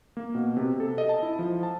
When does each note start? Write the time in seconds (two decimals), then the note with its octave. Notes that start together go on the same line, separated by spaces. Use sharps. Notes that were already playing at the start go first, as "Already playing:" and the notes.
0.17 A#3
0.35 B2
0.57 C3
0.80 A4
0.98 D#5
1.09 A5
1.23 E4
1.39 F3
1.63 A5